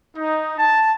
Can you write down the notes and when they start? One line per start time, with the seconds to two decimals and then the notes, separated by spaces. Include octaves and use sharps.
0.16 D#4
0.58 A5